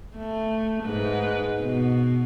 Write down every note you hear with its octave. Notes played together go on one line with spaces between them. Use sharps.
A3
G#2 B4
B2